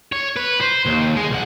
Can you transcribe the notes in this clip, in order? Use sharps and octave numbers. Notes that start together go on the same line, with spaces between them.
C#5
B4
C5
D#2
G#3
B1 F#5